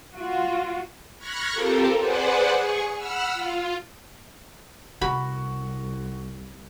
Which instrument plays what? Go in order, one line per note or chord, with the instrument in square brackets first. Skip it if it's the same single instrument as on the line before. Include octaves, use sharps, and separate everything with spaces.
[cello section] F4 F#4
[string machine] B5 C#6 F6 F#6 G#6 A#6
C4 F4 G4 A4 A#4
G#4 B4 C5 D5 F#5
G#4 C#6
F#5 B5 E6 F6
F4
[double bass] C2 [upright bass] C3 [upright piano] F#4 [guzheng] B5